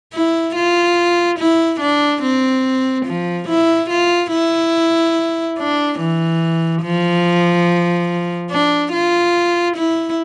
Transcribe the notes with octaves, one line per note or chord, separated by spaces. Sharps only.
E4
F4
E4
D4
C4
F3
E4
F4
E4
D4
E3
F3
D4
F4
E4